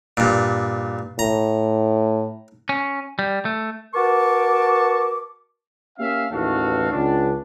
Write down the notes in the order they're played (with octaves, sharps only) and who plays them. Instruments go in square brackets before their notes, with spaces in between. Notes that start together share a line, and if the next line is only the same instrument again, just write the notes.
[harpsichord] G2 A#2
[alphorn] A2 [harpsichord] A#5
[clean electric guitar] C#4
G3
A3
[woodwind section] F#4 A#4 B4 A5 C#6 D6
[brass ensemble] A#3 C#4 G4 E5 F5
A1 D#2 E3 F#4 A4 F5
C#2 D4